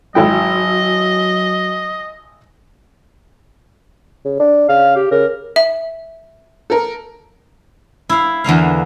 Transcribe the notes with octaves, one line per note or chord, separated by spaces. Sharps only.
G#1 F#3 E4 D#5 G5
C#3
D4
C#3 F5
G4
C#3 A#4
E5
A4 A#4
E4 F5
E2 D3 A#3 F5